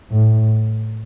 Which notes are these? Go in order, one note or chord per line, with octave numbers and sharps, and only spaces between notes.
A2